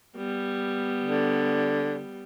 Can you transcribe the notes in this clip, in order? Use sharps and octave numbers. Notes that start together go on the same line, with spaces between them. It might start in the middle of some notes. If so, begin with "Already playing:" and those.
G3 B3
D3